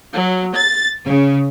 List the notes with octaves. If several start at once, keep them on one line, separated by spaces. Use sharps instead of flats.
F#3
A6
C#3